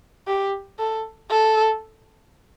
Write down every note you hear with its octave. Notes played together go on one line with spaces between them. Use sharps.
G4
A4
A4